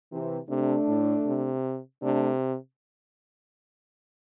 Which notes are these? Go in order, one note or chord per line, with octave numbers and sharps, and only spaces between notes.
C3 E3
C3 A3 D4
A2
C3
C3 A3 D4